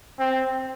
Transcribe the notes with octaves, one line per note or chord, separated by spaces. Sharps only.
C4